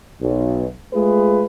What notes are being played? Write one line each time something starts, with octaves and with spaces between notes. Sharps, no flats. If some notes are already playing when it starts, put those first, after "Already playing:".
B1
G#3 A3 F4 G#4 B4